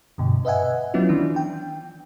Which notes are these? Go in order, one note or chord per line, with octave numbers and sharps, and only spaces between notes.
G2 B2 D3
B4 D#5 E5 F#5 G#5
F#3 B3 C#4 E4 F4
D#3 E3 D4
G5